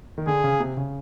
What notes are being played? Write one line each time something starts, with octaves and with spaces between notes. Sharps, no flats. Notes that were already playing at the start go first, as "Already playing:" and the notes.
D#3
D3 G#4
C#3
C3
C#3